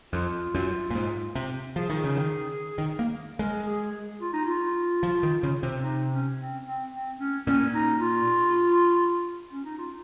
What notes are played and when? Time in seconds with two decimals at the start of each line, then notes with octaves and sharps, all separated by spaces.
0.13 F2 F4
0.55 F#2
0.91 A#2
0.95 G#2
1.36 C3
1.76 F3 G#4
1.90 D#3
2.04 C#3
2.16 D#3
2.78 D#3
2.99 A#3
3.39 G#3 A#4
3.67 G#4
4.21 F4
4.33 D#4
4.45 F4
5.03 F3
5.23 D#3
5.43 C#3
5.63 C3
5.83 D#4
6.11 C#4
6.38 C4
6.65 C4
6.92 C4
7.20 C#4
7.47 A#2 C#4
7.74 D#4
8.01 F4
9.51 C#4
9.65 D#4
9.78 F4